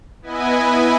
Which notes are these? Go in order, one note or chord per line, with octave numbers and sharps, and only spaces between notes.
B3 E4 B4 D#5 G#5